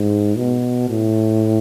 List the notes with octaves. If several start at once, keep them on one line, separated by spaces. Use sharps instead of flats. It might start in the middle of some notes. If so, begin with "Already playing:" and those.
Already playing: G#2
B2
A2